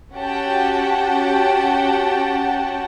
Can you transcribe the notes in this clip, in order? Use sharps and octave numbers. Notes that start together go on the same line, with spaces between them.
C#4 F#4 G4 F#5 G5 A5